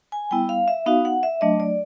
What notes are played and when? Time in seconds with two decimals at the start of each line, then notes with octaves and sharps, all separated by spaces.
0.12 G#5
0.31 G3 B3 E4 G5
0.49 F5
0.68 E5
0.86 B3 D#4 F#4 F5
1.05 F#5
1.23 E5
1.41 F#3 A3 D4 D#5
1.60 D5